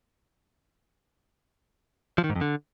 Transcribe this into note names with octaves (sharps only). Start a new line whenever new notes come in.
F3
D#3
G#2
F2
D3